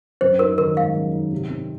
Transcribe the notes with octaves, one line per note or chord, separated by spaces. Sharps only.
F#2 C5
D#4 A#4
D#3 A#4
G#3 F5
F#2
D#4
C3
C4